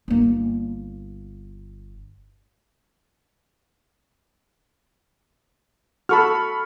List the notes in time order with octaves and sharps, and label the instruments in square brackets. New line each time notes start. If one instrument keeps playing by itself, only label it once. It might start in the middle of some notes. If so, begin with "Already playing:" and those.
[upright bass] G1 A#3
[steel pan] F#4 A4 [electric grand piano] B5 C#6 F6